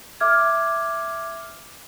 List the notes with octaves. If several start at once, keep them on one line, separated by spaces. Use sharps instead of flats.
E5 D6 F6 G#6